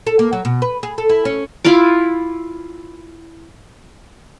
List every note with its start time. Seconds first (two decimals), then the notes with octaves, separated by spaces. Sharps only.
0.07 A4
0.19 A#3
0.33 F#3
0.45 B2
0.62 B4
0.83 G#4
0.98 A4
1.09 E4
1.25 C#4
1.64 E4 F4 F5 D6